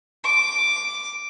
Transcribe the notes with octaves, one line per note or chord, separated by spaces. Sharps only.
D6